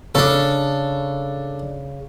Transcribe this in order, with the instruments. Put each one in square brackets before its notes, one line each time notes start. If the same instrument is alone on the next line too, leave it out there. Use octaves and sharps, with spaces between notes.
[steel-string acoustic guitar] C#3 [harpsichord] D4 A4